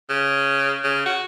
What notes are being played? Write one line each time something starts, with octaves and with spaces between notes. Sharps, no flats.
C#3
C#3
F#4